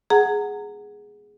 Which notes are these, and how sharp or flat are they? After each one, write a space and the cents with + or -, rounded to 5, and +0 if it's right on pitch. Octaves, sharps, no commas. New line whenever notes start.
G#4 +0 F#5 +0 A#5 -20